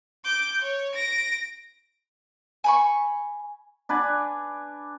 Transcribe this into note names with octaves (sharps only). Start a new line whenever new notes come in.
D6 G6
C#5
A#6 D7
G#5 B5 C#6
D4 B4 D5 G#5